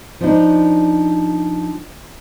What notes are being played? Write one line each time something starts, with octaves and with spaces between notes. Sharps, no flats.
F3 D4 D#4